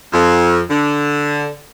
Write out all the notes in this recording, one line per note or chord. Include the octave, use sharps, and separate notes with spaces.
F2
D3